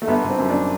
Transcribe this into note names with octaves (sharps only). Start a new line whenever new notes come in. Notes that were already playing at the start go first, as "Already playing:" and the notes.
A3
G1 B3
G1
C4
F#2
D4